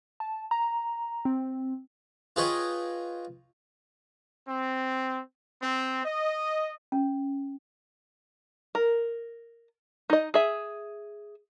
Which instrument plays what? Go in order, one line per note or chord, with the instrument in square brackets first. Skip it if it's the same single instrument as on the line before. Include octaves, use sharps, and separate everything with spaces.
[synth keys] A5
A#5
C4
[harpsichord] F4 G#4 B4 C#5 D#5 G5
[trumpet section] C4
C4
D#5
[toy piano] C#4
[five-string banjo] A#4
D#4 D#5
G#4 E5